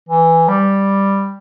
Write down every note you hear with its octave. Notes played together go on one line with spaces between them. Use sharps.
E3
G3